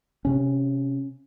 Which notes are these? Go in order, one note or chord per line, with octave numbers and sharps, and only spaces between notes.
C3 C#4